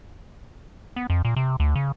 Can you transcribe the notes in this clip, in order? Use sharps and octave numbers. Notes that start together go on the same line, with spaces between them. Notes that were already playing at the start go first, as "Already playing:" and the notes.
B3
F2
A#2
C3
D2
C#3